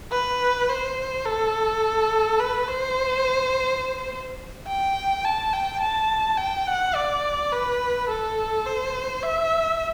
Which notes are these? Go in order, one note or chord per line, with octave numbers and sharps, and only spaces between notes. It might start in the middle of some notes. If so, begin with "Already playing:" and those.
B4
C5
A4
B4
C5
G5
A5
G5
A5
G5
F#5
D5
B4
A4
C5
E5